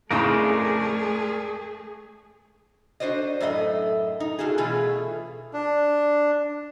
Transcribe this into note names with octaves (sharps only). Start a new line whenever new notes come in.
F2 A2 C#3 A3 G#4 A#4 C5 D5
D4 F#4 C5 D5 D#5
F#2 A2 A3 D#5
D#4
A3 F4 F#4 G#4
B2 E3 A3 F4 G#4
D4